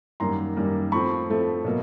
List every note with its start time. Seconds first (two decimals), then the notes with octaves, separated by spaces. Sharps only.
0.20 F#2 D#3 G3 A#3 A#5 C6
0.56 F#2 D#3 G3 A#3
0.92 A2 F3 A3 C4 B5 C#6
1.29 A2 F3 A3 C4
1.64 B2 F#3 A#3